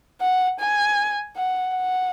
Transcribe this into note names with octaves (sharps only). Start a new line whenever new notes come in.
F#5
G#5
F#5
F#5